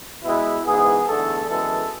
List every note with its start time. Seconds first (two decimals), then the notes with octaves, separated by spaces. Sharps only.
0.24 B2 G#3 B3 E4
0.66 G#2 E3 B3 G#4
1.07 E2 D3 A3 A4
1.49 F#2 E3 G#3 B3 A4